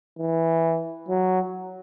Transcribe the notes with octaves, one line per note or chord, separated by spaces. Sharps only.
E3
F#3